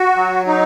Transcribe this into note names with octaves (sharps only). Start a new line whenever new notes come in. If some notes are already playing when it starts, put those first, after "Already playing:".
Already playing: F#4
F#3
D#4